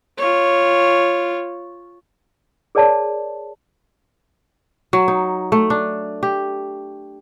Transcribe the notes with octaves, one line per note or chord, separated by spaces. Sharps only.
F4 C#5
G#4 A#4 C#5 D5 A5
F#3
D#4
A3
D4
G4